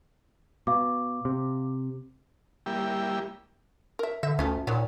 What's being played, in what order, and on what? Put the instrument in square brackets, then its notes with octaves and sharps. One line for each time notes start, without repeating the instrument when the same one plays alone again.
[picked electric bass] B2 [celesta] F5 D6
[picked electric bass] C3
[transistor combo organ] G3 A#3 E4 G4
[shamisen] A#4 E5
[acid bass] D3 [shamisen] E5
[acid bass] D2 [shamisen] C#4 F4 A4
[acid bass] A#2 [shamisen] D#3 F3 F#3